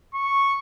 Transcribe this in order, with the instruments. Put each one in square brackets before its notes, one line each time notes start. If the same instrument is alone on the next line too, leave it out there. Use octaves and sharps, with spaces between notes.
[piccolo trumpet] C#6